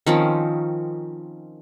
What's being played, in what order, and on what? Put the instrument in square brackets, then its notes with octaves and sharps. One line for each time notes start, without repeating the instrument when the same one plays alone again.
[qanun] D#3 F3 C4 C#4